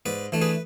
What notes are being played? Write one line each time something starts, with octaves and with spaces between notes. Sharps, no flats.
G#2 B4 D5
E3 A3 D4
G#4 B4